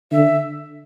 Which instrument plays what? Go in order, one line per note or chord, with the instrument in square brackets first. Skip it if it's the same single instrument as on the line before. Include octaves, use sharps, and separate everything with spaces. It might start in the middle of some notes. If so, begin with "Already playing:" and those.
[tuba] D3 [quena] E5